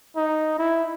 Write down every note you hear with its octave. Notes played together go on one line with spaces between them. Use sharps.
D#4
E4